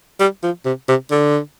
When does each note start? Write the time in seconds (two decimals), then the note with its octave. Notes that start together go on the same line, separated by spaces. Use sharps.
0.20 G3
0.43 F3
0.65 C3
0.88 C3
1.11 D3